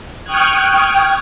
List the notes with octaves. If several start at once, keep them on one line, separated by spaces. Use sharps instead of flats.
G5 C#6 D#6 F6 F#6 G#6